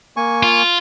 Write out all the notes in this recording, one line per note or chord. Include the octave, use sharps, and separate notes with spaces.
A#3 G#5 C#6
F4